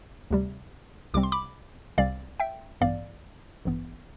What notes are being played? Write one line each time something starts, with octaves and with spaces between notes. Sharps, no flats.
D2 C3 G3
C2 C3 G3 C4 D6
C6
B5 D6
C2 C3 G3 C4 D5 F5
E5 G5
A1 G2 E3 B3 D5 F5
A1 G2 E3 B3